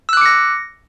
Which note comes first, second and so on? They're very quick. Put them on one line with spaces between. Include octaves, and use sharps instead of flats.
E6 F#6 D6 C#7 A#6